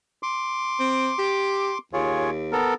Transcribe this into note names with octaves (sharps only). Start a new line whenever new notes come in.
C6 D6
C4
G4
D#2 F4 G#4 C#5
B3 A4 A#4